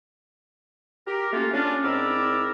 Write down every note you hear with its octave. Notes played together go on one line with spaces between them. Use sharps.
G4 A#4
A3 A#3 C#4 F4 F#4
C#4 D4 F4
G#2 C4 E4 A#4 D5 E6